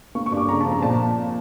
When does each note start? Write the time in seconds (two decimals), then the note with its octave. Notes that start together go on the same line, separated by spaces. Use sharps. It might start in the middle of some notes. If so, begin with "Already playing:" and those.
0.15 A#3 C#6
0.26 C#6
0.32 G2
0.37 D6
0.49 C#3 A#5
0.61 F3 A5
0.72 A#5
0.83 A#2 A5